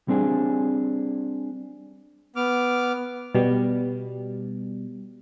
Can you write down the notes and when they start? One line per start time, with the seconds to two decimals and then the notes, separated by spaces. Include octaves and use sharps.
0.08 G3 C4 D4 G#4
2.36 B3 D6 F6
3.35 B2 G3